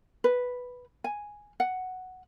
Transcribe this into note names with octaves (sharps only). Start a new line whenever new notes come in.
B4
G#5
F#5